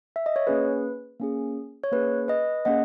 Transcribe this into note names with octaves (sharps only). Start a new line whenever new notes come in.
E5
D#5
C#5
A#3 C#4 G#4 B4
A#3 C#4 G#4
C#5
A#3 C#4 G#4 B4
B4 D#5
A#3 C#4 G#4 D#5 F#5